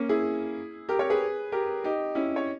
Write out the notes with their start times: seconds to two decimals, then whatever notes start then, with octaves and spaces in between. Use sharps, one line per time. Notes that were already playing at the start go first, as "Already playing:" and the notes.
Already playing: A#3 C#4
0.09 E4 G#4
0.89 G4 A#4
0.99 A#4 C#5
1.10 G#4 B4
1.52 G4 A#4
1.84 D#4 G4
2.15 C#4 E4
2.36 C#5